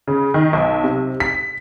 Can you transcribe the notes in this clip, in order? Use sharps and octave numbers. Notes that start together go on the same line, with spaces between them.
C#3
D#3
B1
C3
B6